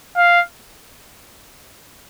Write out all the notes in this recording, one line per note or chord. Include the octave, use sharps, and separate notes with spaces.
F5